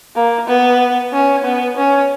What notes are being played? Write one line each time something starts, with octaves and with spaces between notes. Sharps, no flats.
A#3
B3
C#4
B3
C#4